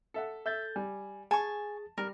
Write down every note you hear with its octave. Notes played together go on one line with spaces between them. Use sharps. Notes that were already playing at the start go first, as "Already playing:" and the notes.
A4 E5 F#5
A4 E5 G6 A6
G3 G#5
G#4 G#5 A5 C#6 A6
G3 A#4